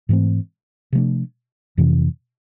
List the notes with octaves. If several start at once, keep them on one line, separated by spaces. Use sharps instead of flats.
G#2 E3 A3 C4
C3 F3 A3 D4
F2 C3 E3